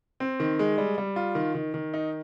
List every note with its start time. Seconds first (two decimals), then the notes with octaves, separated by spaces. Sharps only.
0.20 C4
0.40 D#3
0.59 G#3
0.78 G3
0.98 G3
1.16 F4
1.35 D#3
1.55 D#3
1.74 D#3
1.94 D#4